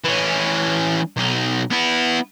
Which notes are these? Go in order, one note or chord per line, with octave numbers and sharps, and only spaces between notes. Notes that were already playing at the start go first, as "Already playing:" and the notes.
E3 C#4
B1 D#4
B3 E4